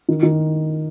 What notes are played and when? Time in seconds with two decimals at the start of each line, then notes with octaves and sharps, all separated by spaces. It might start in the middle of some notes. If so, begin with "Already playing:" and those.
0.08 D#3
0.23 D#3